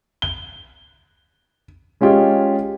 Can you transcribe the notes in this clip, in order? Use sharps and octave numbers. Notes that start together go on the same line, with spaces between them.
G7
G#3 C#4 F4 G4 G#4 D#5